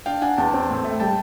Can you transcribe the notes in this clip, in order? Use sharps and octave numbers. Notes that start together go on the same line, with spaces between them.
D4 F5 G5
D4 F#5 G#5
E2 G5 A5
C4
A2
A3
G3 G5 A5